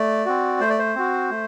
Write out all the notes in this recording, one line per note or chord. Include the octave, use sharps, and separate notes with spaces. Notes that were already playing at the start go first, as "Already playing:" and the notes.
Already playing: A3 D5
C4 F#4
A3 C5
D5
C5
C4 F#4
A3